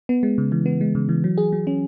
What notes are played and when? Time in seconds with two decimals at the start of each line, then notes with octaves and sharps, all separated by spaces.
0.09 B3
0.23 G#3
0.38 C#3
0.52 E3
0.66 B3
0.81 G#3
0.95 C#3
1.09 E3
1.24 F#3
1.38 G#4
1.53 F#3
1.67 C#4